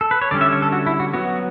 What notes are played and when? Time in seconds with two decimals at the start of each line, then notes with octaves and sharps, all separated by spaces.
0.01 A4
0.11 B4
0.22 C#5
0.31 D3 G3 C#4 D5
0.41 E5
0.53 C#5
0.62 A4
0.72 F#4
0.86 E4
1.00 F#4
1.13 F#3 B3 F#4